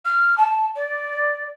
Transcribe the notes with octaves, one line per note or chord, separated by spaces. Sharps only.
F6
A5
D5